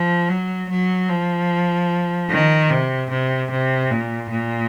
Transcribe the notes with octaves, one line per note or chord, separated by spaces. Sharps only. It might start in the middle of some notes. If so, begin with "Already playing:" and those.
Already playing: F3
F#3
F#3
F3
D#3
C3
C3
C3
A#2
A#2